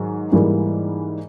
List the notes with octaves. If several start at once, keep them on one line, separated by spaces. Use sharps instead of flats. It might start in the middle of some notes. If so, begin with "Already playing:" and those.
Already playing: G#2 D#3 F#3
G#2 E3 G3 A#3